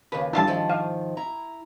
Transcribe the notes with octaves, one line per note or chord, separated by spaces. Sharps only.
D#2 C#3 B4
G3 D4 E4 F4 A5
G#2 D#3 F3
F5
E4 A#5